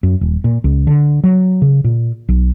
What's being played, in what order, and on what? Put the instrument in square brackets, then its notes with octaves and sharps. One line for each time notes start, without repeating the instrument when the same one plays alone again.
[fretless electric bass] F#2
D#1
A#2
C#2
D3
F#3
C#3
A#2
B1